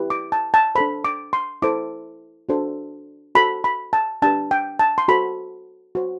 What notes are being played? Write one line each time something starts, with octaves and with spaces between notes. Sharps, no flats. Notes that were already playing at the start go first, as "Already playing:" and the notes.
Already playing: E4 G4 B4
D6
A5
A5
D4 A4 C5 B5
D6
C6
E4 A4 C5 D6
D4 F#4 A4 C5
F#4 A4 C5 B5
B5
A5
D4 G4 B4 A5
G5
A5
C6
F#4 A4 C5 B5
F#4 C5